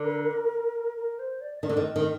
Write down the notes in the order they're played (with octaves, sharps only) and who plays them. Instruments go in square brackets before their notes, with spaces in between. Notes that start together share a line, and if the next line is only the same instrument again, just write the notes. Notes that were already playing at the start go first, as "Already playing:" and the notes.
Already playing: [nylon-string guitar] D3 [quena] A#4
[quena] A#4
C5
D5
[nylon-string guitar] D#3 [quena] D5
[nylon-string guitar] D3
D#3
[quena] D#5
[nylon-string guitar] D#3